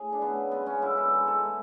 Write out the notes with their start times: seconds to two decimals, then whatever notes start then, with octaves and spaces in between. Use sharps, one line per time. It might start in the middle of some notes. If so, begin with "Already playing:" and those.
Already playing: A2 G#4
0.12 D4
0.22 C#3 F#3 A3 B3
0.52 C#3 G#3 B3
0.66 C#4
0.81 F#2 D3 G#3 E4
0.97 E4
1.11 G#2 E3 G#3
1.27 A4
1.43 E3 A3